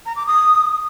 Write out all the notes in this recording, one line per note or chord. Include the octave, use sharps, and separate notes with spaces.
A#5
D6
D#6